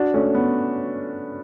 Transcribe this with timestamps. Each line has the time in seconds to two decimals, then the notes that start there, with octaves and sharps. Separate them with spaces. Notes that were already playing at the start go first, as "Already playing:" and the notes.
Already playing: D4 F#4
0.14 A3 C#4
0.35 B3